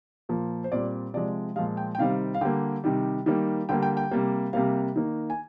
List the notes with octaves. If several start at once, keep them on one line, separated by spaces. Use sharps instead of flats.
A#2 F3 A#3
C5
A#2 G3 C4 D5
C3 F3 G#3 D5
A#2 F3 G#3 F5
G5
G5
C3 D#3 G3 C4 F5
F5
D3 G3 A#3 G5
C3 D#3 G3
D#3 G3 A#3
D3 G3 A#3 G5
G5
G5
C3 G3 A#3
C3 G3 A#3 F5
D#3 A#3
G#5